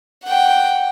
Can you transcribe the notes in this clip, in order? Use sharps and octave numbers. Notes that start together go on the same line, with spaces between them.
F#5 G5